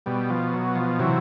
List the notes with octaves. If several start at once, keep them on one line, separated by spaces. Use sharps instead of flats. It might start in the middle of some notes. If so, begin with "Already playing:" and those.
B2 G3
F3
F#3
F3
C3 E3 F#3